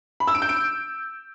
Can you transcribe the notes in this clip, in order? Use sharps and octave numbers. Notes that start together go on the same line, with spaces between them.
B5
E6
D7
G6
D7